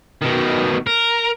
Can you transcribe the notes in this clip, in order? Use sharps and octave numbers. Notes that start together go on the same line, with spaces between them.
B2 D#3
A#4